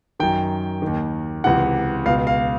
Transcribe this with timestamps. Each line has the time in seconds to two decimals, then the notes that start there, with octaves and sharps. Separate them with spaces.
0.20 F#2 D#3 G5
0.82 D#2 D#3
1.44 C#2 C3 E3 F#5
2.06 C#2 B2 F5
2.27 F5